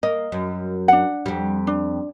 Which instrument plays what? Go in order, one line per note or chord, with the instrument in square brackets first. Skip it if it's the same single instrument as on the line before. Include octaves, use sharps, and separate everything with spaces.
[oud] A#3 [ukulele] D#5
[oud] F#2
[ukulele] D4 F#5
[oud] F2 G3
[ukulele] D4